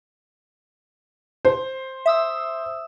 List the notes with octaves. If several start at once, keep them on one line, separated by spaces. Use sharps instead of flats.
C5
E5 D#6 E6